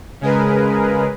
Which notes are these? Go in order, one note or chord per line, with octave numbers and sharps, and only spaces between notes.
C#3 G#3 G#4 A#4 B4